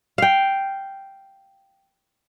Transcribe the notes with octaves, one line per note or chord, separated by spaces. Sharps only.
F5 G5